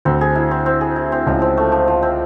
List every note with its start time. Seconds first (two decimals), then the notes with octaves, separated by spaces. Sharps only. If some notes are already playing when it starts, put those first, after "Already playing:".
0.05 D2 D3 C4
0.21 G#4
0.35 E4
0.51 C4
0.66 C4
0.81 G#4
0.96 E4
1.12 C4
1.26 C#2 C#3 F3
1.42 C4
1.57 A3
1.72 F3
1.88 F3
2.03 C4